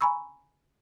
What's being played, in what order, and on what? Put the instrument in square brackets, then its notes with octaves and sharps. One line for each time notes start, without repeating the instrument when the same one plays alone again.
[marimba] G#5 A#5 B5 C#6 E6